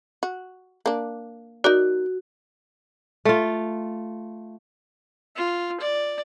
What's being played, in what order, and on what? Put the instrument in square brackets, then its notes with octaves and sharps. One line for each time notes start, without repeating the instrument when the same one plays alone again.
[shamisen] F#4
A#3 D4
[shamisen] D#4 A#4 D5 [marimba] F#4
[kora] A3 F4
[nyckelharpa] F4
D5